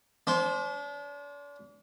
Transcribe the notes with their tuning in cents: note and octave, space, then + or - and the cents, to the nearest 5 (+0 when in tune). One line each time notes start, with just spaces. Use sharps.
D4 -40 C5 +0